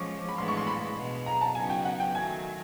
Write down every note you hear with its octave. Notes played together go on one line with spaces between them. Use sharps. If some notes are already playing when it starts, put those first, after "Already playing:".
Already playing: F3 G#3 C#4 C#6 D6
B5
A2 E3 G#3 B3 D4 C6
C#6
C6
B5
B2 G#3 B3
A#5
A5
C#3 F#3 B3 D#4 F#4 G#5
G5
F#5
G5
D#3 F#3 A3 G#5